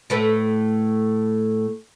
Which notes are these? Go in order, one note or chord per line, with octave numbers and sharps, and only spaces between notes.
A2 A3 B4